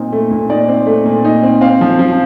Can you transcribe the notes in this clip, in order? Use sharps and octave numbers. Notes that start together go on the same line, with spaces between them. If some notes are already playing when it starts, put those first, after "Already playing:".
Already playing: A#2 C4 D#4
A3
A#2
D#4 D5
C4
A3
A#2
D#4
C4
C4 F5
F3
F3